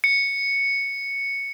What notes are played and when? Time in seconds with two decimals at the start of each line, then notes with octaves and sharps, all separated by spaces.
0.04 C#7